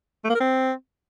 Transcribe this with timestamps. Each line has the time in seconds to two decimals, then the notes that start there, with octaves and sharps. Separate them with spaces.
0.24 A3
0.30 A#3
0.35 A#4
0.40 C4